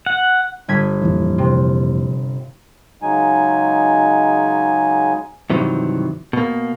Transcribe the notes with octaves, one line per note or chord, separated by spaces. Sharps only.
F#5
G1 G#6 B6
F2 A#2 E3
C3
C#3 F#3 G#3 D#4 G#5
G2 C3 D#3 E3 F#3
B2 A#3